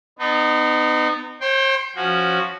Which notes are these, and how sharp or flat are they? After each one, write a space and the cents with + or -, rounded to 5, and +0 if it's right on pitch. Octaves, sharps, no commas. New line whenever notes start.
B3 +30 D#4 -25
C5 +45 G5 +0 C6 +0
F3 +0 C#4 +0 F#4 +0